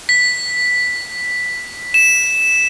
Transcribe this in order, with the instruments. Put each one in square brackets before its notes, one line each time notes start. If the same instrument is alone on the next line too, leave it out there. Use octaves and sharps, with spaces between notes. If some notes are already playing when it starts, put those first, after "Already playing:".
[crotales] B6
E7